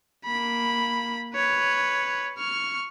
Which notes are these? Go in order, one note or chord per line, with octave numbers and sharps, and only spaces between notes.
A#3 B5
B4 C#5
C#6 F6